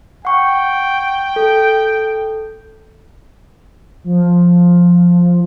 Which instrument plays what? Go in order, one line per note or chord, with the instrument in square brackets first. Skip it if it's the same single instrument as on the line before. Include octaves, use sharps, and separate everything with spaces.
[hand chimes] F#5 C#6 [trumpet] G5
[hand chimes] A4
[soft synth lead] F3